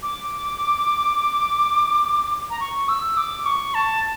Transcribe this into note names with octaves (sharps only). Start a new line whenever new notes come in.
D6
A#5
C#6
E6
D6
C#6
A5